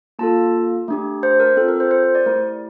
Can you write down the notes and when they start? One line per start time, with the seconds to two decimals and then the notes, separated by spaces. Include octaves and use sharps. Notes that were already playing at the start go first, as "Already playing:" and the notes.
0.19 A#3 F4 A4 A5
0.88 A3 D4 G4
1.23 C5
1.40 A#4
1.57 C4 F4 A4
1.68 A#4
1.80 C5
1.91 C5
2.03 C5
2.15 D5
2.26 A3 E4 G4 A#4